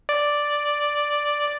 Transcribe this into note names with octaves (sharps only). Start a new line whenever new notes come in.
D5